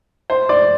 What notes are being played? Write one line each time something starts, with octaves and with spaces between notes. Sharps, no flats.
C5
D5